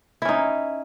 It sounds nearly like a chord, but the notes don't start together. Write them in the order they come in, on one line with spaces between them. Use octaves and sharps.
E4 C#4 D#4